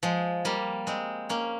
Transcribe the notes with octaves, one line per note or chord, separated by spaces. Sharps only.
F3 G#3
G3 A#3
G#3 C4
A#3 C#4